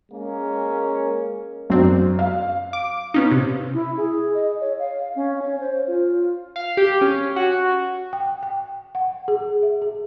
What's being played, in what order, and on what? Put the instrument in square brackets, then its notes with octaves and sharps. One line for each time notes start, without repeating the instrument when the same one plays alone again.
[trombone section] G#3 A#3 C#4 A#4
[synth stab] G#1 C4 D4 [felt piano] F#2
[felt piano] F5
[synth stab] D6
B3 C#4 D#4
C3
[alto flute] E4
G#4
D#5
C#5
F5
C#4
C#5
C5
F4
[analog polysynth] F5
G4
C#4
F#4
[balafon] G5
G5
F#5
G#4
E5
G#4